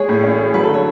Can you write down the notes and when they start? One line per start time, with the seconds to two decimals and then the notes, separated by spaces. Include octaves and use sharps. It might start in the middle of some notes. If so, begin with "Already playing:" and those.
Already playing: G#3 G#4 C#5
0.09 A2
0.24 C#4
0.38 G#4
0.54 F#3 B4
0.63 A4
0.69 D3
0.74 C#5